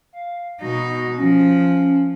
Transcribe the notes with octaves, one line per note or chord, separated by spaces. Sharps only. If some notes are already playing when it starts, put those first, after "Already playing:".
F5
B2 D#4 F#4
F3 C#4